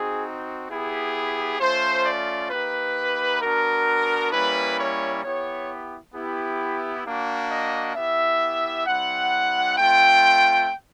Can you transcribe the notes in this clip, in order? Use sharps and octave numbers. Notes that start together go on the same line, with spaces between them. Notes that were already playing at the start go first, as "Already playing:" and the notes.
Already playing: C4 D#4 F#4 G#4
B3 E4 G4 G#4
A3 C#4 F4 C5
D5
A#3 D#4 G4 B4
B3 D4 F#4 A#4
G3 A#3 C#4 E4 B4
C#5
B3 E4 G4 C#5
B3 E4 G4
A#3 D4 F#4
D#5
B3 E4 G4 E5
G3 C4 E4 F#5
A3 C4 F4 G5